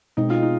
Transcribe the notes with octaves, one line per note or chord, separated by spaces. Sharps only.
B2 G#3 C4 D#4
F4
D#4